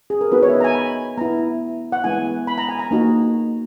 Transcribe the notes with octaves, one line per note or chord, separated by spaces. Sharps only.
G#4
A#4
B3 D#4 F#4 B4
C#5
E5
D#5
A#5
G#5
B5
B3 E4 A#5
F#5
G#3 B3 E4 G#5
B5
A#5
G#5
A#5
A#3 D#4 F#4